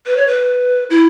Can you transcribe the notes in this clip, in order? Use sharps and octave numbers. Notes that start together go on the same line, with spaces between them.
B4
C#5
B4
E4